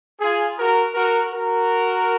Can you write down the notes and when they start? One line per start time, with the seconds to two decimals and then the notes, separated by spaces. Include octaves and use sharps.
0.20 F4 G#4
0.57 F#4 A#4
0.94 F#4 A#4
1.32 F#4 A#4